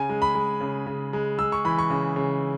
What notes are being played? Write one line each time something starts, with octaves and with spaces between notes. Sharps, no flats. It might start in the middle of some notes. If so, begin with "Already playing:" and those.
Already playing: C#3 G#5
G#3
B5
G#3
C#3
C#3
G#3
G#3 E6
C#6
E3 B5
C#6
C#3
C#3